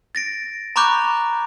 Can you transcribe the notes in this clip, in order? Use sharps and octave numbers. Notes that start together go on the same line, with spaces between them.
A6 A#6 D7
A#5 B5 C#6 D6 F#6 G6